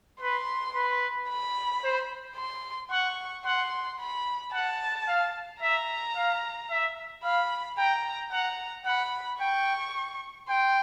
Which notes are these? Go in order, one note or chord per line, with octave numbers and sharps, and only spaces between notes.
B4 C6
B4
B5
C5
C6
F#5 C#6
F#5 C6
B5
F#5 A5
F5
E5 A#5
F5
E5
F5 B5
G5 A#5
F#5 A#5
F#5 B5
G5 C#6
G5 C6